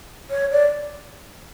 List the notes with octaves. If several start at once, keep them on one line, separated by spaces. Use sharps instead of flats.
C#5
D5